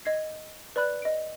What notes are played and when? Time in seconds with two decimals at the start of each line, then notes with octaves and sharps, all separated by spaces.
0.05 D#5 G#6 C7
0.76 B4 D5 B5 F#6
1.02 D#5 D7